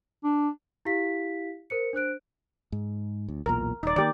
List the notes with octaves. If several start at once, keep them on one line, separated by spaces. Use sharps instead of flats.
D4
E4 G4 F5 B6
A#4 C5 C#7
D4 C5 F#6 D7
G#2
D2
B1 E2 A#2 A#4
D#1 D#4 D5
D#3 G#3 A#3 G4 D5